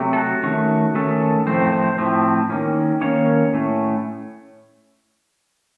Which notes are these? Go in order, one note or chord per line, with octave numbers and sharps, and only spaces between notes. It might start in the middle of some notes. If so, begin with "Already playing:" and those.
Already playing: C3 F#3 A3
A4
F#4
D#3 A3 C#4 F#4
D#3 A3 C#4 A4
A2 F3 A3 C4 C5
C5
A2 F3 A3 C4
D#3 A#3 C#4
D#3 A#3 C#4 C#5
A2 A3 C#4